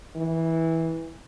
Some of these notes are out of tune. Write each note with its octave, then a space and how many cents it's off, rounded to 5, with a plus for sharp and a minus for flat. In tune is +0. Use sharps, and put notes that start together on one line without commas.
E3 -15